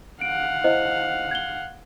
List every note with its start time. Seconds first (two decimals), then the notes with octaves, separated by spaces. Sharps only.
0.21 F5 F#5 D7
0.64 E4 C5 D#5
1.31 G#6 G7